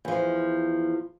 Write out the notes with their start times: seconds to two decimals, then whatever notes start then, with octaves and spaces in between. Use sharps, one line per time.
0.05 E2 F3